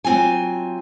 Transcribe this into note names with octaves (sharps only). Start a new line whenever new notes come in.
F#3 C4 F4 G#5